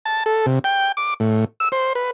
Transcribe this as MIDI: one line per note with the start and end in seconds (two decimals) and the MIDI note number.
0.05 0.24 81
0.26 0.46 69
0.46 0.59 48
0.64 0.92 79
0.97 1.14 86
1.20 1.45 45
1.60 1.69 88
1.72 1.93 72
1.95 2.11 71